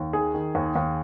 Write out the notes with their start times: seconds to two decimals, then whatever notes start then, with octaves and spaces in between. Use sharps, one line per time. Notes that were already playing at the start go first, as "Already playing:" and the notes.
Already playing: D#2
0.13 D#3 G#4
0.34 D#3
0.55 D#2
0.76 D#2